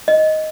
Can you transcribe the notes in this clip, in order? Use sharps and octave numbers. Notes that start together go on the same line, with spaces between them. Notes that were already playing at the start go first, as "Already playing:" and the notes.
D#5